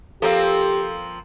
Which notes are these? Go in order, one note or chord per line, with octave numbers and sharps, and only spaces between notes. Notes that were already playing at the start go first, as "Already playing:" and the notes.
F3 A#3 C4 G4 A4 F5